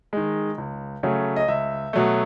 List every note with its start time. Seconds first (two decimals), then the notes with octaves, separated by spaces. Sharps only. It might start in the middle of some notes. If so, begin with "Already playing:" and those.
0.13 D#3 G#3
0.58 C#2
1.03 C#3 F#3 A3
1.36 D#5
1.48 C#2 E5
1.93 B2 F#3 A3